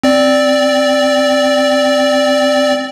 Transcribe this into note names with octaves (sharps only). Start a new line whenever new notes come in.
C4 D5